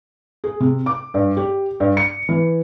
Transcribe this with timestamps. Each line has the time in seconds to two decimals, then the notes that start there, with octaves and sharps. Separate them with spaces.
0.44 G#4
0.60 C3
0.86 D6
1.14 G2
1.37 G4
1.80 G2
1.97 C#7
2.29 E3